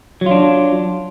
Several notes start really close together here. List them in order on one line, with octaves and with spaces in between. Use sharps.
F#3 F4 D4